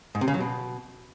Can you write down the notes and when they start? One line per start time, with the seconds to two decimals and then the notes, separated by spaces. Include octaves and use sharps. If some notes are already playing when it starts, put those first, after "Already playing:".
0.15 G#2
0.21 C3
0.28 C#3
0.34 F#3
0.40 B2